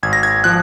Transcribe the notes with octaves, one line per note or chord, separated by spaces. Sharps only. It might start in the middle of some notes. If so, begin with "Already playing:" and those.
G#1 G#6
A#6
G#6
F3 F#6